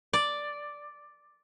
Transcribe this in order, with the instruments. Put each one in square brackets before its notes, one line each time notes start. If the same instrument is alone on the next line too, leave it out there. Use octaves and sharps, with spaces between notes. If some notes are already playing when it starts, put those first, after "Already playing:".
[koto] D5